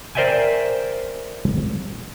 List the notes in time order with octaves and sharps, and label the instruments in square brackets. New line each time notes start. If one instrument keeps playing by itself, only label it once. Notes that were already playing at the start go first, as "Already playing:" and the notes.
[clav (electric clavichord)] A#4 C5 D5 E5 G5 G#5